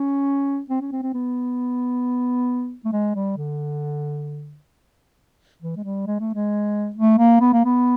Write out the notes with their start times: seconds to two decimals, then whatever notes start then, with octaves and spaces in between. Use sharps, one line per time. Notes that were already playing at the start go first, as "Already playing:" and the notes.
Already playing: C#4
0.70 C4
0.81 C#4
0.92 C4
1.03 C4
1.14 B3
2.85 A3
2.93 G#3
3.15 G3
3.37 D3
5.62 E3
5.77 G#3
5.84 G3
6.07 G#3
6.20 A3
6.35 G#3
6.96 A3
7.18 A#3
7.41 B3
7.53 A#3
7.65 B3